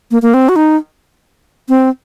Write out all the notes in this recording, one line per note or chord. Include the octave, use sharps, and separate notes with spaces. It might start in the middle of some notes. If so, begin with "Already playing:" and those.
A#3
A#3
C4
F#4
D#4
C4